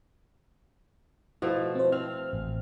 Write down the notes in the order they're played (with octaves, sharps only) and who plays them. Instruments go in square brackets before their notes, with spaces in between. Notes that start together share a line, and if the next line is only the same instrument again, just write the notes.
[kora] B2 F3 A3 [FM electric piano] E4
[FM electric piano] C4 C5
[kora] C4 [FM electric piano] F6
[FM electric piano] A1